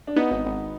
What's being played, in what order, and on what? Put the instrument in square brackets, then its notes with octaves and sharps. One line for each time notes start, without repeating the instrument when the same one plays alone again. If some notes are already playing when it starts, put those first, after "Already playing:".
[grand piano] D4
[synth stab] B3 [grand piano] D#4
[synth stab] G#1
G#1